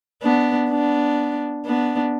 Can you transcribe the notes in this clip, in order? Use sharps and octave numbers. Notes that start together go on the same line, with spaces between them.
B3 D4
B3 D4
B3 D4